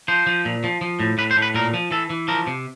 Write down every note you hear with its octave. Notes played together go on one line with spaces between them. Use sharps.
F3 C5
F3
A#2
F3
F3
A2
A2 B4
C5
A2
B4
A#2 A#4
F3
E3 A4
E3
F3 A#4
C3